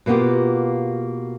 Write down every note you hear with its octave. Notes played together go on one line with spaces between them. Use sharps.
B2 A#3 B3 F4 G4